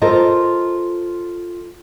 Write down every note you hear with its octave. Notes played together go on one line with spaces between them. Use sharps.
F4 A4 A#4 C5 D#5